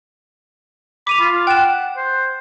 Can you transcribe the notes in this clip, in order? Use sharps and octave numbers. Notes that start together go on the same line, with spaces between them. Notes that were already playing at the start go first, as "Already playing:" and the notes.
B5 D6 D#7 F7
F4
F#5 G5 E7
C5